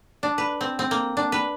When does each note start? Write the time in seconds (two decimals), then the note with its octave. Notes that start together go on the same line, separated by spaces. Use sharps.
0.23 D4
0.38 B4
0.61 C4
0.79 C4
0.91 A#3
1.17 D4
1.32 B4